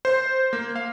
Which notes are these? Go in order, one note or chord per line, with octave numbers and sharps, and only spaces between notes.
C5
A#3
F5